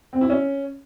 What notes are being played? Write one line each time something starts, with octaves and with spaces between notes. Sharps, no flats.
C4
E4
C#4